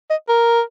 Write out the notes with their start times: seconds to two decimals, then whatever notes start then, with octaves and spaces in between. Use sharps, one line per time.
0.10 D#5
0.29 A#4